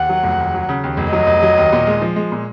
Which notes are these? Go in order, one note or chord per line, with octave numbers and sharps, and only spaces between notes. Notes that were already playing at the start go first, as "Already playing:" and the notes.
Already playing: D#2 F#5
F#3
F1
D#2
F#3
C#3
D#2
F1
F#3 D#5
F1
F#3
D#2
A#2
G#3
F3
G#3
A#2